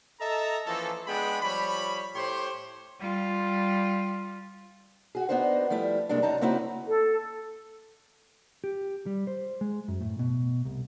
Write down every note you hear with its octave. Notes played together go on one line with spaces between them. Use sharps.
A4 D#5 E5 A5 A#5
E3 F3 A#3 C#4 A4
G#3 B3 D4 G#4 G5 B5
F3 G3 C#5 B5
A2 G4 C5 C#5 C6
G3 F4
F#4 G#4
B3 D4 D#4 F#4 C5
F3 G3 A3 E4
G2 C3 G#3 A#3 D4
F#2 D#4 A5 A#5
C#3 A#3 C4 D#4 E4 F#4
A4
G4
G3
C5
G#3
F#2
A2
B2
C2